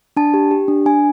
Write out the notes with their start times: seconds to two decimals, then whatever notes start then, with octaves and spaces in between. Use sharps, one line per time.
0.17 D4 A5
0.34 G4
0.51 G4
0.68 D4
0.86 D4 G#5